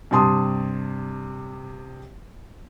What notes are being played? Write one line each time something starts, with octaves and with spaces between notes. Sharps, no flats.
G2 C3 A5 C6 D#6